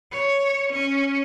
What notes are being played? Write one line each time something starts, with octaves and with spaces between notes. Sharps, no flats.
C#5
C#4